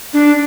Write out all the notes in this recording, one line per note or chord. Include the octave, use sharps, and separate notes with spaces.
D4